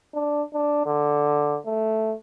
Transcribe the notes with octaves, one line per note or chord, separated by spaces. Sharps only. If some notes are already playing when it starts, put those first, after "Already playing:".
D4
D4
D3
A3